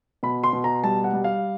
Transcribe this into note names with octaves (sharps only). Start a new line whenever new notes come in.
B2 B5
C6
B2
A#5
G3 A5
F#5
G3
F5